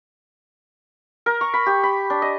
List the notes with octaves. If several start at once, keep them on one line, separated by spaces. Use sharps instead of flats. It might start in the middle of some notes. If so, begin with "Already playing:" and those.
A#4
C#6
B5
G4
B5
D4
D#5